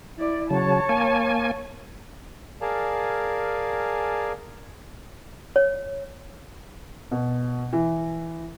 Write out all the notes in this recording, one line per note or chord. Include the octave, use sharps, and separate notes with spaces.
E4 D5
C#3 F#3 C#5 A5
A#3 G#5
G#4 A#4 D5 F5 G#5 A5
C#5
B2
E3